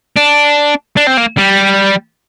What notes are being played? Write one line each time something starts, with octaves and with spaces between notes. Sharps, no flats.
D4
D4
C4
A#3
G3